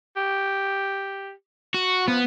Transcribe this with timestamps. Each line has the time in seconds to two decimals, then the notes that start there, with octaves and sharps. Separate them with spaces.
0.17 G4
1.74 F#4
2.08 F3 B3